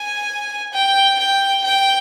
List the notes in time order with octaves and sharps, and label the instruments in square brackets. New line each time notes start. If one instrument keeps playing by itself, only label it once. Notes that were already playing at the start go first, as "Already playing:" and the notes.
Already playing: [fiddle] G#5
G5
G5
G5